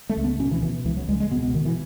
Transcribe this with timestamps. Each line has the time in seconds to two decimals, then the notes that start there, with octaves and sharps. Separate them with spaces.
0.09 A3
0.17 C#2
0.24 B3
0.39 B2 C#4
0.51 E3
0.62 B2 E3
0.85 C#2 E3
0.97 F#3
1.08 C#2 G#3
1.20 G#3
1.31 B2 B3
1.43 B3
1.54 B2 D#3
1.65 E3